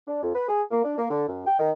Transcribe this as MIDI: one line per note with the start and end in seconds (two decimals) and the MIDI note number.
0.08 0.20 62
0.23 0.30 41
0.34 0.45 71
0.48 0.63 68
0.71 0.82 58
0.84 0.94 62
0.98 1.07 58
1.10 1.27 50
1.28 1.45 42
1.46 1.56 79
1.59 1.71 51